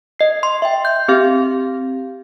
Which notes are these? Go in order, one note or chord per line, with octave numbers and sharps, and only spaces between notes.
D#5 C7
C6
E5 G5
G6
C4 G4 F5